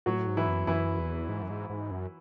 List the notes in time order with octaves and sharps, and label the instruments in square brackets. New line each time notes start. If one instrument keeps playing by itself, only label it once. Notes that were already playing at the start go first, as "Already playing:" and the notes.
[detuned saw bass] A2 [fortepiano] F#3 F#4
[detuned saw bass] G#2
[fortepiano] E3 E4
[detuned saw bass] F#2
[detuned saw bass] F#2 [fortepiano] E3 E4
[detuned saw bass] E2
G#2
F#2
G#2
G#2
F#2